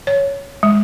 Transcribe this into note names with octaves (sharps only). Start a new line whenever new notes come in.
C#5
G#3